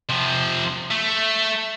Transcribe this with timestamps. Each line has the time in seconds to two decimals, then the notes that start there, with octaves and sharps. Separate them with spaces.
0.10 C3 F3
0.91 A3